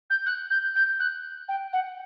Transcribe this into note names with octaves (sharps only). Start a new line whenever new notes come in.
G6
F#6
G6
G6
F#6
G5
F#5